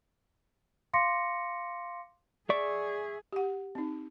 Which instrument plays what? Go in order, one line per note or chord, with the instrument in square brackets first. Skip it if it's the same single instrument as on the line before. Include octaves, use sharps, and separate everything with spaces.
[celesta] F5 C6 D6 A#6 C#7
[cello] G#4 [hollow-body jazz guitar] D5 [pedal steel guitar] E5 C#6
[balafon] G4 F#5
C4 D#4